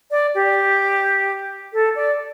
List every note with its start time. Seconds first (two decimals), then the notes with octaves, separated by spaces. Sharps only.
0.11 D5
0.35 G4
1.73 A4
1.96 D5